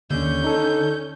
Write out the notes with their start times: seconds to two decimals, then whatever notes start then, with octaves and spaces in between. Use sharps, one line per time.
0.10 D#2 D3 C#4 G6
0.44 D#4 A4